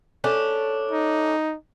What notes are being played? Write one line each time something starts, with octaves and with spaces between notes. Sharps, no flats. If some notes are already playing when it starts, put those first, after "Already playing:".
A3 C#4 D4
D#4